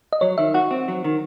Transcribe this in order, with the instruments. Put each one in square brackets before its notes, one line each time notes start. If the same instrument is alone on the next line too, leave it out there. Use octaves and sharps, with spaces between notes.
[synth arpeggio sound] D#5
[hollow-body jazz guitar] F#3 [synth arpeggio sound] C#5
[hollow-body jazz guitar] D#3 [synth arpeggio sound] E5
[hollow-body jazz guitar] F#4 [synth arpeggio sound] F#5
[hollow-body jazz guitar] C4
F#3
D#3